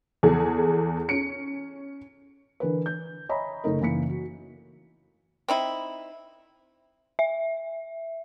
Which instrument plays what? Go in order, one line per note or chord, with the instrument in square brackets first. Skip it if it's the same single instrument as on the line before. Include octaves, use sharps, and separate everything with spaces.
[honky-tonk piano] E2 G#4 A4
C#4 C#7 D7
[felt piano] D3 E3 A#4 B4
G6
C#5 D#5 E5 G#5 A#5 B5
F#1 A3 D#4 A#4
F#1 E3 A#3 E4 B6 C#7
F#4
[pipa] C4 D#4 E4
[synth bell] E5